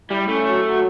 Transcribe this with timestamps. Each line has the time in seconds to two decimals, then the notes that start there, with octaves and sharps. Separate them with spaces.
0.10 G3 E4
0.28 A3 C#4
0.46 F#3
0.65 F#3